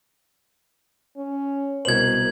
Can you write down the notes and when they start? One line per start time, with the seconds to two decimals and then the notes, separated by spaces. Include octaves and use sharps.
1.17 C#4
1.85 C2 B2 A#4 C5 G#6 F#7